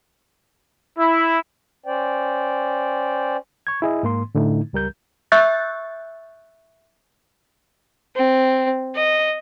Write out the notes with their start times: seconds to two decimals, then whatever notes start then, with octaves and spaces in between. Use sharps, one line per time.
0.98 E4
1.86 C#4 C5 D5 G5
3.67 C#6 G#6
3.82 E4 G#4 D#5
4.03 G#2 A#3 C6
4.35 A2 D3 A3 D#4 E4
4.73 C#2 G3 A#4 G6
5.32 E5 C#6 E6 F#6 G6 A6
8.16 C4
8.96 D#5